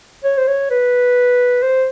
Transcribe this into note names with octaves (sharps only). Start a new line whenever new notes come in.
C#5
C5
C#5
B4
C5